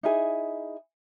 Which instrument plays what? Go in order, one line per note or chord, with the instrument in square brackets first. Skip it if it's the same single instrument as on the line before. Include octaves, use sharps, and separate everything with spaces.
[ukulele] D#4 E4 G#4 G#5